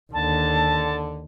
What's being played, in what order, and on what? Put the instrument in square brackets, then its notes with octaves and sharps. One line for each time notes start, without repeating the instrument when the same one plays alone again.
[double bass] D#2 [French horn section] D3 [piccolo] A5